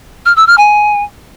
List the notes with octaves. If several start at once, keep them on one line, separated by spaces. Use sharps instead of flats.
F6
E6
F6
G#5